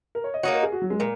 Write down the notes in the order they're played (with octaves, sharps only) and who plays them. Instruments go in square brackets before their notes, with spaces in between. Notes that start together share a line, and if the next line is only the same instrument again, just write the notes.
[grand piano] A#4
C#5
D#5
[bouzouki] A#3 D#4 F#4 [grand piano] C#5
[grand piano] A#4
G#4
F#4
F#3
G#3
[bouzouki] A#2 [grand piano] A#4